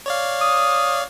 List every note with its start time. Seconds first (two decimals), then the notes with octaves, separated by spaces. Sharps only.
0.06 C#5 D5 F5
0.42 D#6